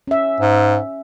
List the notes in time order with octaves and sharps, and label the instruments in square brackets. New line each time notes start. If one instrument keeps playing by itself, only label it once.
[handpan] C#4 E5
[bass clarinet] G#2